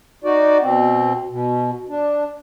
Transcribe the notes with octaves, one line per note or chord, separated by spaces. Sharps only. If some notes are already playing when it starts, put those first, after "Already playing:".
D#4 F#4 D5
B2 C4
B2
D4